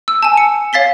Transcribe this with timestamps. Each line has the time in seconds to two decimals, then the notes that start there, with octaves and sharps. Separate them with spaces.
0.08 E6
0.23 G#5 A5
0.37 C#7
0.73 C#5 F5 A6 B6 G7